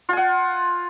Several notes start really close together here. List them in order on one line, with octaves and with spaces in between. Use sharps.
F4 G#5 F#5